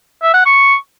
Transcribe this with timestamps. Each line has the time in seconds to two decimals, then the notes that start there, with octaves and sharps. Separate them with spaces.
0.22 E5
0.34 F#5
0.46 C#6